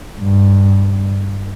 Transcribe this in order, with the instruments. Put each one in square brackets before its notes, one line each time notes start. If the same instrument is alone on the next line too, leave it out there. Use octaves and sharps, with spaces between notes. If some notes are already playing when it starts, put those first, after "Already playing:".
[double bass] G2